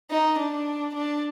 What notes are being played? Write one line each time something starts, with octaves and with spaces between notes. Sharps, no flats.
D#4
D4
D4